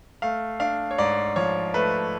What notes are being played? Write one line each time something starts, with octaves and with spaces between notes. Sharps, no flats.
A3 F5
D4 F5
C#5
G#2 D5
F3 C#5
A3 B4